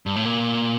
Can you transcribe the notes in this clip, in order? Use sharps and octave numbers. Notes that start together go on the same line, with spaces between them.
G2
A2
A#2